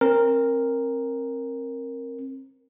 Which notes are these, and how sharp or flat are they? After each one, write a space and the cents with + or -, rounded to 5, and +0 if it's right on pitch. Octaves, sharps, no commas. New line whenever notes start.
C4 +30 A#4 +0